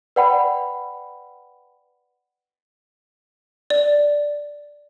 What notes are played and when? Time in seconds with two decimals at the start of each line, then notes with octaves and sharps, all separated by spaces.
0.16 B4 D5 F#5 G5 B5
3.70 D5